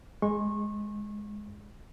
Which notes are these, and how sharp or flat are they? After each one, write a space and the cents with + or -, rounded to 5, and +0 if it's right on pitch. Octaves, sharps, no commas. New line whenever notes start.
G#3 +0 C#6 -30